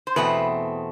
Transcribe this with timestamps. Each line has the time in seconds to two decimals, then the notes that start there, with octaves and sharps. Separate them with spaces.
0.07 C5
0.16 E2 B2 A3 C4 B4